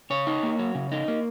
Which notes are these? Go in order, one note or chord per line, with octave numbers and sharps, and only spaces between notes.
C#3 C#5
D#4
A#3
F#3
C#3
D#4
A#3